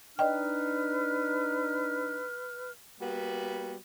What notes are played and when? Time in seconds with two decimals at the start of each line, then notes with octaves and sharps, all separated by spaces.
0.19 D4 D#4 B4 D5 D#5 G5 F6
3.00 G3 A#3 B3 F#4